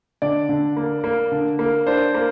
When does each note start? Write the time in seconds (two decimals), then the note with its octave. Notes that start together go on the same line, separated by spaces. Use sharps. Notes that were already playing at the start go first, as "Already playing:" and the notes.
0.22 D3 D5
0.49 D3
0.77 A#3
1.04 A#3
1.32 D3
1.59 A#3
1.87 D4 C5
2.15 A#3